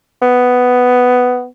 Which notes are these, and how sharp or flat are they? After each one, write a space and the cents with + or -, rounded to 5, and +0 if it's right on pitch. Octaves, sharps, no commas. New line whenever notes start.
B3 +10